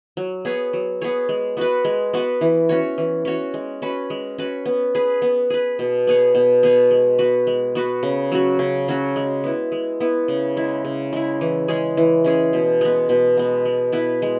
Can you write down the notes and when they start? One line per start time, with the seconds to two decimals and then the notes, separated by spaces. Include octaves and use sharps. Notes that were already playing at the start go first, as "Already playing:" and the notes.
0.17 F#3
0.45 B3 G#4 C#5
0.73 F#3
1.01 B3 G#4 C#5
1.29 G#3
1.57 B3 F#4 B4
1.85 G#3
2.13 B3 F#4 B4
2.41 E3
2.69 C#4 F#4 C#5
2.98 E3
3.25 C#4 F#4 C#5
3.54 G#3
3.82 C#4 F#4 B4
4.10 G#3
4.38 C#4 F#4 B4
4.66 B3
4.95 G#4 B4
5.22 B3
5.50 G#4 B4
5.79 B2
6.07 B3 G#4 C#5
6.35 B2
6.63 B3 G#4 C#5
6.90 G#3
7.19 B3 F#4 B4
7.47 G#3
7.75 B3 F#4 B4
8.03 C#3
8.32 F#3 C#4 F#4
8.59 C#3
8.88 F#3 C#4 F#4
9.16 G#3
9.44 B3 E4
9.72 G#3
10.00 B3 E4
10.28 C#3
10.57 G#3 E4
10.85 C#3
11.13 G#3 E4
11.41 E3
11.68 G#3 C#4 G#4
11.97 E3
12.24 G#3 C#4 G#4
12.53 B2
12.81 G#3 B3
13.09 B2
13.37 G#3 B3
13.65 G#3
13.92 B3 E4 B4
14.22 G#3